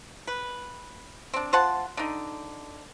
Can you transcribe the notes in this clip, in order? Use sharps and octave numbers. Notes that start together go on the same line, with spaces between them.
B4
C4 D4
F4 C5 F#5 A5
D3 D#4